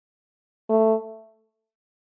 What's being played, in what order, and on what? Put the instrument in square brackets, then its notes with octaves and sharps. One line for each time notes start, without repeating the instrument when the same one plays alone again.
[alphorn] A3